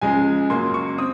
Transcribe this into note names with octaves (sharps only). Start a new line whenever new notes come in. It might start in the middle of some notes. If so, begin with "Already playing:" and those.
C#2 C#3 F3 G#3 G#5
F#2 C#3 F#3 A#3 C6
C#6
C4 D#6